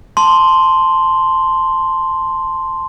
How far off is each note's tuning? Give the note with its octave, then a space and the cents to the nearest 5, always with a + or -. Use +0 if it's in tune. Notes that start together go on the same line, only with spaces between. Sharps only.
A5 +0 C6 +0